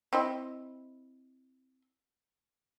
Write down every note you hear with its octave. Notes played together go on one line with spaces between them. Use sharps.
C4 E4 D#5